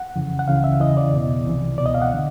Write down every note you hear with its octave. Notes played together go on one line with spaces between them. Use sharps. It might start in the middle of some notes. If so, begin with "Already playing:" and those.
Already playing: F#5
F2 C#3 E3
F#5
C#2 C#3 E3 F5
E5
E2 C#3 E3 D#5
D5
E2 B2
C2 C3 E3
C#2 B2 D5
D#5
F5
F#5
D3